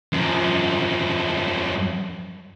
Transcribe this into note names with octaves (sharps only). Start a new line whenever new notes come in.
F#2 F3